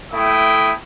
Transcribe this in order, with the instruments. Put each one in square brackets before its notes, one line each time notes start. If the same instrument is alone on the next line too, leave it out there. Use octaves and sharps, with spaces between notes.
[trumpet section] A3 E4 G5 D#6